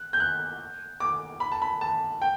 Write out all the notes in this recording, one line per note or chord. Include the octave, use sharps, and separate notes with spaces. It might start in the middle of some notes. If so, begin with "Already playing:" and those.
Already playing: F#6
G6
F#6
D6
B5
A5
B5
A5
G5